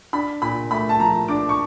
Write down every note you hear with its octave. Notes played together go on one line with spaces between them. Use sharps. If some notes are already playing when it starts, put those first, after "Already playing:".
D4 B5
A#2 B5
A3 B5
A5
F3 A#5
D4 D6
C#6